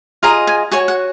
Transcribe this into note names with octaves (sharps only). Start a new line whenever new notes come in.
F4 G#4 D#5 A#5
G#5
F#4 C#5 G#5
F#5